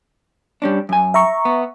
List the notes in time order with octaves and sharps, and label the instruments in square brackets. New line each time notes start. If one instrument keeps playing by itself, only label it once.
[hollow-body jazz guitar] G3 C#4 D4
F#2 G#5
[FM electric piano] E5 A#5 C#6
[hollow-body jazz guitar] B3